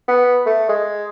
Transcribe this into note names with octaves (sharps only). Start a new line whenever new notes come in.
B3
A3
G#3